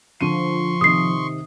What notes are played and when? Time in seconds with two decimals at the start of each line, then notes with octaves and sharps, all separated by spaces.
0.21 D3 F3 C6 C#6 D#7
0.81 C3 D#3 D#6 C7